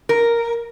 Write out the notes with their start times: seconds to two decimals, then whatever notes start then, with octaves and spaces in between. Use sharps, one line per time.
0.09 A#4